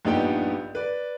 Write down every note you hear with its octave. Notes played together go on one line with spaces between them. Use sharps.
A#1 G2 B3 D#4 G4 G5
B4 D5